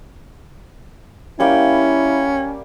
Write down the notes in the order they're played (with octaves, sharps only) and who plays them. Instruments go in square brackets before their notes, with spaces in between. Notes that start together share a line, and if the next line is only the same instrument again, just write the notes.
[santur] G3 A#3 G5 [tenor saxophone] C#4 [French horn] E4